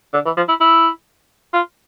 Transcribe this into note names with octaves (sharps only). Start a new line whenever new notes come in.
D3
E3
F3
E4
E4
F4